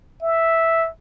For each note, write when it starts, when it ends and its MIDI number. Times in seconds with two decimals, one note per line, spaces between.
0.23 0.88 76